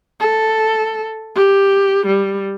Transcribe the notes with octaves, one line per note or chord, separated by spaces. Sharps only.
A4
G4
G3